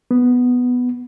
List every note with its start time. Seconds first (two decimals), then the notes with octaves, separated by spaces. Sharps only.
0.11 B3